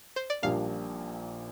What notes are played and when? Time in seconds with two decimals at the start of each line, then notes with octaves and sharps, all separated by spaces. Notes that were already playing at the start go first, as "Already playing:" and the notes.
0.16 C5
0.30 D5
0.42 A#1 A#2 G3 A#3 D4 F5